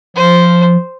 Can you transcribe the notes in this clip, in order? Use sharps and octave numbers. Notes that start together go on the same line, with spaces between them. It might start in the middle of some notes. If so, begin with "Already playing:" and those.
F3 C5